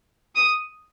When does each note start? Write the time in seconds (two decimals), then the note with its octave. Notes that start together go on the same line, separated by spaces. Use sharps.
0.36 D#6